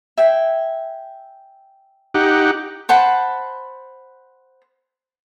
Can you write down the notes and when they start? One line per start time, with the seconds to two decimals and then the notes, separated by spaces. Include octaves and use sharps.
0.18 E5 G5 G#5
2.15 D#4 G4 F#5
2.89 C5 F#5 A5 B5